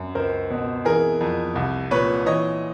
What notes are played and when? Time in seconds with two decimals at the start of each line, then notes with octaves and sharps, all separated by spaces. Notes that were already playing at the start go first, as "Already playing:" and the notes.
Already playing: F#2
0.15 C#2 A#4 C5
0.50 B2
0.85 E3 G#4 A#4
1.21 F2
1.56 C2
1.91 A#2 B4 C#5
2.26 E3 C#5 D#5